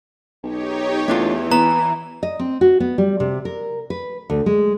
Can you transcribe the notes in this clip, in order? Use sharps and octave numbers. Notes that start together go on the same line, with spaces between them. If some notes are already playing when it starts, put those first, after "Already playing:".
B1 D#4 G4 C#5
E2 E3 A3 D4 F4
B3 A#5
D#5
C4
F#4
B3
G3
C3
A#4
B4
D2
G#3